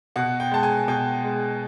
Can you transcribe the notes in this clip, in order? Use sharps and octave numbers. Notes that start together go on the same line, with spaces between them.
B2 F#5
G5
G#3 A5
G#5
B2 G5
G#3